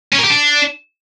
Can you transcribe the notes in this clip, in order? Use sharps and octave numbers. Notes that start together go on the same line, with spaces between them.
C#4
A#4
G4
D4